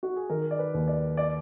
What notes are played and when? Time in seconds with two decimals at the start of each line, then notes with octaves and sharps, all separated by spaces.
0.03 F#4
0.16 G#4
0.30 D#3 A#4
0.51 D5
0.59 B4
0.74 D#2
0.88 D5
1.17 D5